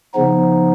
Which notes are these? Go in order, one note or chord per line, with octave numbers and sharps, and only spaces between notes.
C#3 F3 B3 D#4